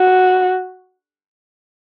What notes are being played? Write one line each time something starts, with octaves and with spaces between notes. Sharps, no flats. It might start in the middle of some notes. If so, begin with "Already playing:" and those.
Already playing: F#4